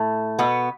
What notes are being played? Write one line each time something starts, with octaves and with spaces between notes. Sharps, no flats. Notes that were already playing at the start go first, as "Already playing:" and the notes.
Already playing: A2 A3
B2 B3